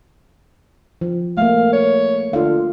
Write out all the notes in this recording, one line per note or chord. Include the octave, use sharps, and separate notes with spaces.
F3
A3 A#3 F5
C#5
D3 F4 F5